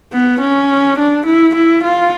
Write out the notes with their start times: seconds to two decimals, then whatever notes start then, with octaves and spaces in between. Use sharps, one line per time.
0.13 B3
0.41 C#4
0.99 D4
1.26 E4
1.55 E4
1.84 F4